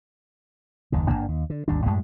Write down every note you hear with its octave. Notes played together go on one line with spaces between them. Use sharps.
F#1 D#2 D#3
G1 G#2 A#3 D4
D#2
D3
G#1 D#2 G3 D4
F#2 A2 G3 G#3